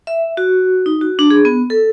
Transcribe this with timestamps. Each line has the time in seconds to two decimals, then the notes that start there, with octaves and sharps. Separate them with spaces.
0.07 E5
0.37 F#4
0.86 D#4
1.01 F#4
1.19 D4
1.30 G#4
1.45 B3
1.70 A4